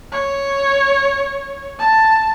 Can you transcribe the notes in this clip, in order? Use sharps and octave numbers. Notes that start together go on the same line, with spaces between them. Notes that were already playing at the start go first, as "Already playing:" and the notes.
C#5
A5